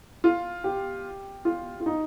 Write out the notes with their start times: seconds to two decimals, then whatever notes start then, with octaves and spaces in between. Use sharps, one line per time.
0.24 F4
0.64 G4
1.45 F4
1.80 F4
1.86 D#4